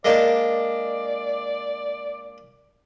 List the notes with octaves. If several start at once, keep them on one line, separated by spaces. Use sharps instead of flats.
G#3 A#3 D4 D5